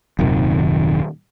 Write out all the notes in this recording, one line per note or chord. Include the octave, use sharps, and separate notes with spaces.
D#1 F#2 C3 D#3